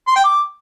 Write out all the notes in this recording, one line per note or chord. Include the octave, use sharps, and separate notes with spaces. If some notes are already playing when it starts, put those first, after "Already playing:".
C6
G5
D6